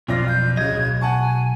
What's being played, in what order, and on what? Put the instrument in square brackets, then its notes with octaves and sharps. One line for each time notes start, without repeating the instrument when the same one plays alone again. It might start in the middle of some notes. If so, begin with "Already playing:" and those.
[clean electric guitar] B1 [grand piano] F2 D5 A#6 [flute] F4
[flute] G6
[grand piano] D1 C#3 [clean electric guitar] D#5 [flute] G#6
[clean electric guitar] B1
[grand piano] F#5 A5 C#6 [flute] G#5